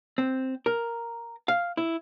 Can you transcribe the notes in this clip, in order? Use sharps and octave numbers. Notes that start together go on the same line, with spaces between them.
C4
A#4
F5
E4